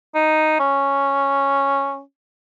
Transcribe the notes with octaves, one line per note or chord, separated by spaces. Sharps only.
D#4
C#4